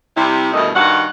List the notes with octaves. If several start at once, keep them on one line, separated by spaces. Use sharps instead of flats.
C3 G3 E4
G2 B2 D#3 E3 A3 D#5
G2 D#3 F#4 F5 F#5